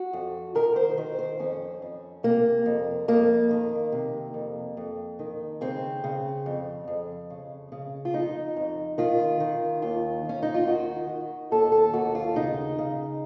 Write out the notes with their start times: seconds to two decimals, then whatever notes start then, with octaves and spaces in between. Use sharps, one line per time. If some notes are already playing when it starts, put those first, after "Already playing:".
Already playing: F#4
0.13 F2
0.55 D#3 A#4
0.76 C5
0.97 D#3 C5
1.19 C5
1.39 F2 C#4
1.82 F2
2.23 C3 A#3
2.66 F2
3.08 F2 A#3
3.51 D#3
3.92 C3
4.34 F2
4.77 F2
5.19 D#3
5.61 C#3 C4
6.04 C#3
6.46 F2
6.88 F2
7.30 C#3
7.72 C#3
8.05 F4
8.14 F2 D#4
8.56 F2
8.98 D#3 F4
9.40 D#3
9.82 D#2 F4
10.25 D#2 C#4
10.43 D#4
10.54 F4
10.67 D#3 F#4
11.09 D#3
11.51 D#2 A4
11.72 A4
11.93 D#2 F#4
12.15 F4
12.36 C#3 D#4
12.78 C#3